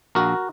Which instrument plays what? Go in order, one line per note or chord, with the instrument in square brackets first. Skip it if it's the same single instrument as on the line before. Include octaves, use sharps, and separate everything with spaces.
[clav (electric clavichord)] A#1 F#4 A#4